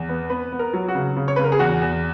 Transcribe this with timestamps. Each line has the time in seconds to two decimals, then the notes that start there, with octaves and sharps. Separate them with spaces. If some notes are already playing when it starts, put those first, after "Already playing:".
Already playing: E2
0.09 B3
0.30 B3 B4
0.52 B3
0.59 A#4
0.73 F#3
0.88 F#4
0.95 C#3
1.17 C#3
1.28 C#5
1.36 C#3 B4
1.44 A#4
1.52 G#4
1.59 E2 F#4
1.81 E2